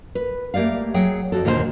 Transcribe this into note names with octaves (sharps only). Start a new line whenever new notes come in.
B4
A3 A#3 G4 D5 F5
F#3 G#4 F#5 G5
F2 A#2 F#4 A4
D#2 A#2 D3 F#4 C5